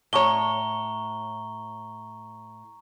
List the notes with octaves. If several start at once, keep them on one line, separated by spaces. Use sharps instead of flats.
A2 C#5 A#5 C#6 G7